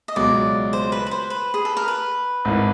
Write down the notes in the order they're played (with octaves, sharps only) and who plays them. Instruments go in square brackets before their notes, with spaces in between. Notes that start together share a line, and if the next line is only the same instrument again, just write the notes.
[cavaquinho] D#5
[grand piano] C#2 B2 F#3 [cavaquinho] D5
[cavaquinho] C5
B4
B4
C5
B4
G#4
A4
A#4
B4
[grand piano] G#1 G#2 E3